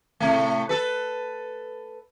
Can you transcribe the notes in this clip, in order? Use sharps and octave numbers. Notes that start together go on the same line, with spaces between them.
A2 C3 A3
A4 B4